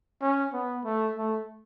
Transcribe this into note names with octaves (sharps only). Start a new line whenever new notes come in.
C#4
B3
A3
A3